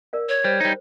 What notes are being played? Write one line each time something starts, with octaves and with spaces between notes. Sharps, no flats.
A#4 D5 F5
C#5
G3 C5
G3 D#4